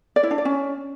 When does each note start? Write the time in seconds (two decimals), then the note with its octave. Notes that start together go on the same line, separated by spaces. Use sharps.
0.16 D5
0.23 E4
0.31 D4
0.38 D5
0.45 C#4